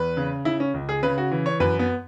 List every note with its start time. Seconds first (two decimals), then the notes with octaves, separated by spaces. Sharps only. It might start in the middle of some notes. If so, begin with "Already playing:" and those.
Already playing: E2 B4
0.17 C#3
0.45 C#3 E4
0.60 C#4
0.74 C#2
0.89 G#4
1.03 C#3 B4
1.18 F#4
1.31 E3
1.46 C#5
1.60 F#2 B4
1.79 B3